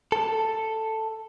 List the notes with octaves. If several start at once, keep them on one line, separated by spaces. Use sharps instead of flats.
A4